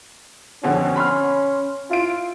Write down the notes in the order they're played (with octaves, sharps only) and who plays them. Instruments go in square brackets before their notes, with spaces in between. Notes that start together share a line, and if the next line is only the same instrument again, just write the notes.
[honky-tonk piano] F2 B2 D3 [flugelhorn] C#4
[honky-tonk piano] B5 C6 F6
[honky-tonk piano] E4 D7 [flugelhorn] F4